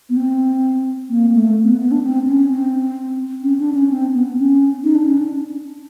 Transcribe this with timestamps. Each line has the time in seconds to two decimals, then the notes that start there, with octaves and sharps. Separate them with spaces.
0.09 B3
0.17 C4
1.10 A#3
1.34 A3
1.64 C4
1.68 B3
1.80 B3
1.91 D4
2.03 C4
2.27 C#4
2.50 C4
3.43 C#4
3.60 D4
3.74 C#4
3.90 C4
4.14 B3
4.37 C#4
4.84 D#4
4.95 D4
5.06 C#4
5.17 D4